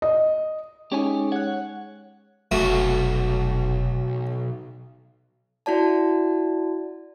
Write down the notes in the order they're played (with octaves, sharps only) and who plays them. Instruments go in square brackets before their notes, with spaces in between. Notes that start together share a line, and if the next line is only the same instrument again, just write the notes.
[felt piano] D#5
[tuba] G#3 [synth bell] C#4 D#4 [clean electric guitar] G4 C#5 G#5
[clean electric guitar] C#5 [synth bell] F#5 F#6
[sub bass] F1 [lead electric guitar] B1 [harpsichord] A3 F#4
[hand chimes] E4 F#4 D5 A5